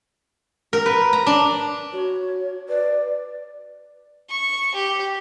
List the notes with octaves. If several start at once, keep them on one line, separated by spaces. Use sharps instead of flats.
A#4
B4
A#5
D4
F#4 C#5
B4 D5
C#6
G4